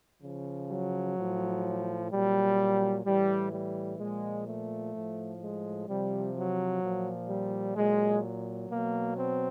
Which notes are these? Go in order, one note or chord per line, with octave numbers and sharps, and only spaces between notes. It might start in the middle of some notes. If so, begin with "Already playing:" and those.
C#3 F3
F#3
A2 F3
A#2 F#3 G3
A2 E3 G3
G3
A#2 F3 G#3
A3
A2 F3
G#3
C3 F3 G3
F#3
A#2 F3
G3
A#2 F#3 G#3
B2 F#3 A#3
C4